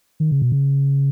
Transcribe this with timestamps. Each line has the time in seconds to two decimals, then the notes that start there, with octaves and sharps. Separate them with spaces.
0.20 D#3
0.31 C#3
0.42 B2
0.52 C#3